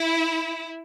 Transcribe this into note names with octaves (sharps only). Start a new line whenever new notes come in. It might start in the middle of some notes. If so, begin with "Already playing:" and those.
Already playing: E4